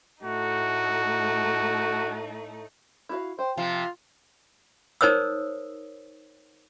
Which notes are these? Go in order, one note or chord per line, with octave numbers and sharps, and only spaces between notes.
A2 A3 D#4 F#4
E4 F#4 F5
C5 G5
C3 F3 F4
D#4 A#4 C5 C#5 D#6 E6